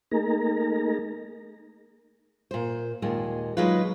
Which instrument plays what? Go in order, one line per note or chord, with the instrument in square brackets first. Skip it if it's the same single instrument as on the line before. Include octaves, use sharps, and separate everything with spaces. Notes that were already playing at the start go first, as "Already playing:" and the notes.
[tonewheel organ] A3 A#3 D#4 G#4 A#4 A#5
[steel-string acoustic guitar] A#2 C5
D#2 A#2 G#3
F#3 G#3 D#4 F4 B4